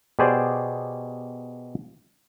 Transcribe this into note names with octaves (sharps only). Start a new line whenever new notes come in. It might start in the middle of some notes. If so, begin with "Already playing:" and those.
B2 G4 G#4 C5 D5